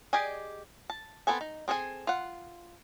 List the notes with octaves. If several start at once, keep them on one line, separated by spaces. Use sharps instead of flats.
G4 G#4 D5 D#5 G#5
A5
B3 C4 A4 G#5
D#4
C4 G#4 A4 G#5
F4 F#5